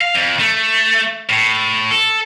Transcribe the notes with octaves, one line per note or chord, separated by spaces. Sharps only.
F5
F2
A3
A2
A4